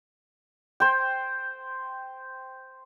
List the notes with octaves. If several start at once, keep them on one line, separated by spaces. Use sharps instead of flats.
C5 G5